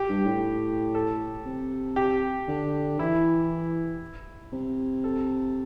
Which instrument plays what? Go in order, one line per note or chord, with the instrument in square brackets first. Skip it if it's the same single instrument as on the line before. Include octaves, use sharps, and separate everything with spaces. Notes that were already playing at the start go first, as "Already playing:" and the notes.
Already playing: [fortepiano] G4
[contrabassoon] G2
A2
[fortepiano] A4
[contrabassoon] C3
[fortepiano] G4
[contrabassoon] D3
[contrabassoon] E3 [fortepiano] E4
[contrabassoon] C3
[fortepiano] A4